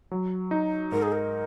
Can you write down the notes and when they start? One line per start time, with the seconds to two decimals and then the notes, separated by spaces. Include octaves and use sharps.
0.11 F#3
0.51 D#4
0.92 G#2 A#4
1.02 G#4
1.12 A#4